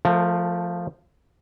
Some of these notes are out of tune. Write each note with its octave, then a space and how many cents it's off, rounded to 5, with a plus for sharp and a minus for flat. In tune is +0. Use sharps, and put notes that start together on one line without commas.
F3 +0 A3 +0 A#4 -35